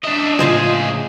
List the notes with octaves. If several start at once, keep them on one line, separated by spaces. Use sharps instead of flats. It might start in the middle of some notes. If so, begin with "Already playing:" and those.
C#2 D4 D#5 E5
A2 C#3 F3 F4 G#4 C5 D#5